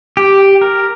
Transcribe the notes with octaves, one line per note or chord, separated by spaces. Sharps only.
G4
A#4